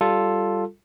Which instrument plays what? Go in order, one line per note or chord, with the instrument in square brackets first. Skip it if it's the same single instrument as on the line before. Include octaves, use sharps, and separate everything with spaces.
[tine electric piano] G3 F4 A4